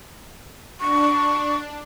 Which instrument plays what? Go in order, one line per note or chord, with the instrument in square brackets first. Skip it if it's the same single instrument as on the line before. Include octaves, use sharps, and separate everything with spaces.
[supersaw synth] D4 [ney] C#6